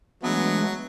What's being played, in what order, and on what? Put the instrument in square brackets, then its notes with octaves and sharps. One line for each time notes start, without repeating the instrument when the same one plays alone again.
[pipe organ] E3 A3 D4 [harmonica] F#3 [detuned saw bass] G#3 [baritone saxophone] B3